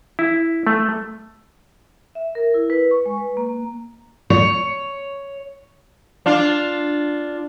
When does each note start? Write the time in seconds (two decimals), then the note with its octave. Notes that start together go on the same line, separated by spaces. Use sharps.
0.19 E4
0.67 A3
2.15 E5
2.35 A#4
2.54 E4
2.70 B4
2.91 C#6
3.06 G#3
3.18 B4
3.37 A#3
4.30 C#5
6.26 D4 F4